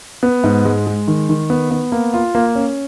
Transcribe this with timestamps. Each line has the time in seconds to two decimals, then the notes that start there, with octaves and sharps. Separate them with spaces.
0.23 B3
0.44 G#2
0.65 G#3
0.87 G#3
1.08 D#3
1.29 D#3
1.50 B3
1.71 B3
1.92 A#3
2.14 F4
2.35 A#3
2.55 C#4